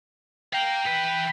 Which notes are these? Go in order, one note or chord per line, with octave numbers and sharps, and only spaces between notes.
F5 G5 A#5
E3 B4